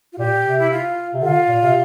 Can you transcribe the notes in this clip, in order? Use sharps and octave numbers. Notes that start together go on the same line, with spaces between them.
F4
A#2 G4
C3
E4
F4
C3
D3 F4
A#2
C3